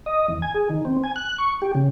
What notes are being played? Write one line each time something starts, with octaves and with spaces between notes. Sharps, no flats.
D#5
E2
G#5
G#4
D#3
C4
G#5
F#6
C#6
G4
C#3